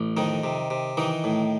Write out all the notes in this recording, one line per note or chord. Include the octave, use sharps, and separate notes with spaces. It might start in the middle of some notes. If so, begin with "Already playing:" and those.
Already playing: A1
F2 D#3 D#4
C3
C3
D#3 E3 D#4
A2